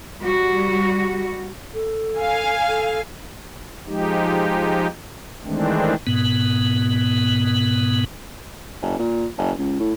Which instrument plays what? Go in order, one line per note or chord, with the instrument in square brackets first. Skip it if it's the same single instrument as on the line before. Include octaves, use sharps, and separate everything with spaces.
[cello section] G3 F#4
[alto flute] A4
[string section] F5 G#5
[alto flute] A4
[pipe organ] F3 G#3 D#4 G4
D#3 E3 G#3 A3 C4 D4
[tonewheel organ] G#2 B2 B3
[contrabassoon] F#1
A#2
F#1
C#2
A2